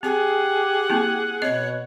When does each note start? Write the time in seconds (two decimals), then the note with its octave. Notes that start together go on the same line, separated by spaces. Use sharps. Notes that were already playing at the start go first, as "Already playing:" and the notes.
0.03 C4 G4 G#4 F#5
0.90 A#3 C4 E4
1.42 B2 C4 C#5 D#5